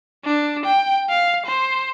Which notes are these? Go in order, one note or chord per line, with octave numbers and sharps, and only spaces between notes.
D4
G5
F5
C5